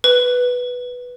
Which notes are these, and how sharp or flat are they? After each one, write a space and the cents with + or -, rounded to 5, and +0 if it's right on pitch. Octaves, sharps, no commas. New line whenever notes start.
B4 +0